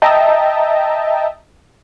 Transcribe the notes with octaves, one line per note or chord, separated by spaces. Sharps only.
D#5 E5 G5 A5 A#5